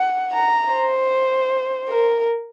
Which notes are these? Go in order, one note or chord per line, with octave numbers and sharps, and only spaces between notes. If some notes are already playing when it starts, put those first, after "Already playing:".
Already playing: F#5
A#5
C5
A#4